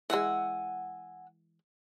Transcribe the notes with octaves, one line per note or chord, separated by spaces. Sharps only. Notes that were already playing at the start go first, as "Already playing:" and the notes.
E3 G#3 F#5 G#5 E6